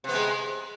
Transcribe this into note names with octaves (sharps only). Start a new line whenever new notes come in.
C3 G#3 B3